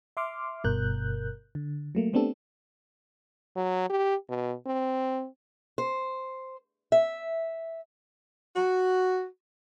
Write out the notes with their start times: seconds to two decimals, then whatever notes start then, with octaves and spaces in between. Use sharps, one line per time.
0.17 E5 C6 D6 F6
0.64 G1 G2 B2 A#4 F#6 G6
1.55 D3
1.95 F#3 A3 A#3
2.13 A3 B3 C4 D4 G4 A4
3.56 F#3
3.89 G4
4.29 B2
4.66 C4
5.78 C5
6.92 E5
8.56 F#4